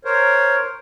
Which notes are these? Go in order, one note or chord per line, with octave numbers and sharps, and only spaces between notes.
A#4 C5 C#5